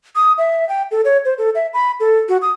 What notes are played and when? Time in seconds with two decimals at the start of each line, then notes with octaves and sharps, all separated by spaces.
0.15 D#6
0.38 E5
0.69 G5
0.91 A4
1.05 C#5
1.25 C5
1.38 A4
1.55 E5
1.73 B5
2.00 A4
2.29 F#4
2.42 D#6